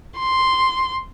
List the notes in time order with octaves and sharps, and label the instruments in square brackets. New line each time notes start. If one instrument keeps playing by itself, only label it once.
[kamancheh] C6